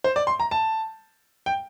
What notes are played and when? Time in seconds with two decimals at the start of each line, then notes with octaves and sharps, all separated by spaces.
0.04 C5
0.16 D5
0.27 C6
0.40 A#5
0.51 A5
1.46 G5